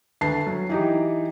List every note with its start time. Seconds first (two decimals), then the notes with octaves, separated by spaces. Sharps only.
0.21 D2 B4 A5 C7
0.47 F#3
0.69 E3 D#4 G4